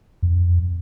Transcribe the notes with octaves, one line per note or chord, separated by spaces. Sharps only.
F2